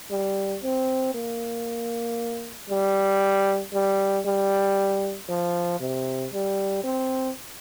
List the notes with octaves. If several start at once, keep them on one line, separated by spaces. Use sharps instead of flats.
G3
C4
A#3
G3
G3
G3
F3
C3
G3
C4